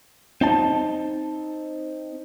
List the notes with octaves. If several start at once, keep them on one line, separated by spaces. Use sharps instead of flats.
C4 D#4 A5